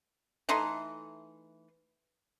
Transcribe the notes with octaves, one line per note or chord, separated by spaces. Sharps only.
E3 A3 D#4 C6